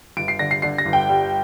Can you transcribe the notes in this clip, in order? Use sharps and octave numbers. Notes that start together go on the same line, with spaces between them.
G1 D7
C7
D3 A#6
C7
D3 C7
A#6
G1
G5
G3